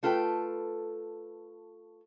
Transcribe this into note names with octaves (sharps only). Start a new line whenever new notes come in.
A3 F4 A4 B4 G5